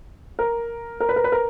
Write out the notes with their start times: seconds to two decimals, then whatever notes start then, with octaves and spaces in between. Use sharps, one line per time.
0.39 A#4
1.00 A#4
1.09 B4
1.16 A#4
1.24 B4
1.32 A#4